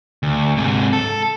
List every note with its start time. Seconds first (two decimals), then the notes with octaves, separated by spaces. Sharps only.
0.23 D2
0.57 G#2 C3
0.93 A4